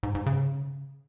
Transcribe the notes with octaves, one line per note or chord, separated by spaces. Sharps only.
G#2
G#2
C#3